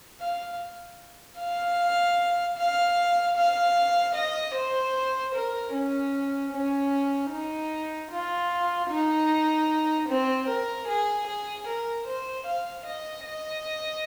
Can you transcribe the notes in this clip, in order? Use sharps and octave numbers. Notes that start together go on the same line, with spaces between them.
F5
F5
F5
F5
D#5
C5
A#4
C#4
C#4
D#4
F4
D#4
C4
A#4
G#4
G#4
A#4
C5
F5
D#5
D#5